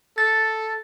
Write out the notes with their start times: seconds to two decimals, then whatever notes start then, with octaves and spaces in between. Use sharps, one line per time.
0.18 A4 A6